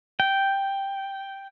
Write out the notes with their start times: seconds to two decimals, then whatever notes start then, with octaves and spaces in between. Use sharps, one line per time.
0.20 G5